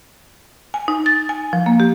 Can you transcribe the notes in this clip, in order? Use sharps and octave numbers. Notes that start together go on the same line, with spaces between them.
G#5
D#4
A6
G#5
F3
A#3
G4